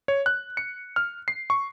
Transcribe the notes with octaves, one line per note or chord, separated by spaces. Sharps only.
C#5
F#6
C#7
F6
C7
C#6